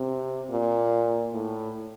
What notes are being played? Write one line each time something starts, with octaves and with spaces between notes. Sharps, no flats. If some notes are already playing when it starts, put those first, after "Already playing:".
Already playing: C3
A#2
A2